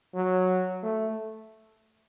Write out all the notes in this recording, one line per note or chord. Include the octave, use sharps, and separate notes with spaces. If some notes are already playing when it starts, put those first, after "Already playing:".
F#3
A3